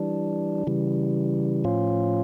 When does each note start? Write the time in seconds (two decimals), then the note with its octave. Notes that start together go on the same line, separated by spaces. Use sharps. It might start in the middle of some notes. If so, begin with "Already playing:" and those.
Already playing: E3 G3 D4
0.67 C#3 E3 G3
1.64 A2 F3 C#4 F4